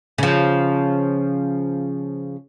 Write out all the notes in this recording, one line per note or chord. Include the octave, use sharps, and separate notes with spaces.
C#3 F3